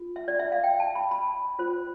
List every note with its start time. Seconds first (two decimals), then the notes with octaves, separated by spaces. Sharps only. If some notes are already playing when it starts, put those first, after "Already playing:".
Already playing: F4
0.16 E5
0.28 D5
0.39 E5
0.52 F5
0.64 G5
0.80 A5
0.95 B5
1.11 B5
1.59 F4 C5